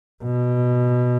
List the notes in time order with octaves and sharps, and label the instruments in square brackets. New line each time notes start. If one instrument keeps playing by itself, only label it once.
[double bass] B2